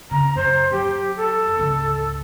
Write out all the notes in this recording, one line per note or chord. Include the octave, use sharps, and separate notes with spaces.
C#3 A#5
F#2 C5
F#2 G4
A4
G#1 C#2